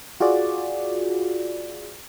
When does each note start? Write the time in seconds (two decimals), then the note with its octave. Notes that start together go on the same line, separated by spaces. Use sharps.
0.20 F4 F#4 G#4 D5